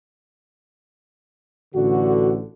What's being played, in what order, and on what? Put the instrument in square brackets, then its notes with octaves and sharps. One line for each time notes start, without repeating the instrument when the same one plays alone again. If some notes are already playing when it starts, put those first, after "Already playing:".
[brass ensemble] A1 D3 [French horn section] F#4